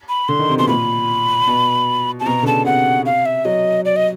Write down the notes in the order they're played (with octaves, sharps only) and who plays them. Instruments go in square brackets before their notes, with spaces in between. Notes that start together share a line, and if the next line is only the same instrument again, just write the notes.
[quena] B5
[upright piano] D3 [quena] C6
[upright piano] D#3
C3
[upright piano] B2 [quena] C6
[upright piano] A#2 [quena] B5
[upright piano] B2
[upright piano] C3 [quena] A5
[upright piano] B2 [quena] A#5
[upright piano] D3
[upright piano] C#3 [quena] A5
[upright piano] C3 [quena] F#5
[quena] F5
E5
[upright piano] F#3 [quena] D#5
[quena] D5
D#5